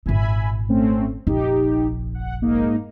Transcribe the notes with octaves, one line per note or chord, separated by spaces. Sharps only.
G#1 A#2 E5 G#5 B5
A3 C4 C#4
F1 A#1 D#4 G4
F#5
G#2 A#3 D#4